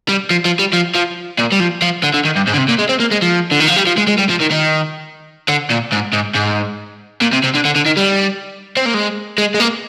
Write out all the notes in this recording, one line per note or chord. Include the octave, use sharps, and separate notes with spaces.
G3
F3
F3
G3
F3
F3
A#2
G3
F3
F3
D3
D3
D#3
G2
G#2
D3
C3
A#2
G#3
C4
A#3
G#3
F3
D3
D#3
F3
G3
F3
G#3
G#3
G3
F3
D#3
D#3
D3
A#2
G#2
G#2
G#2
A#2
C3
C3
D3
D3
D3
D#3
G3
C4
A#3
G#3
G#3
G#3
A#3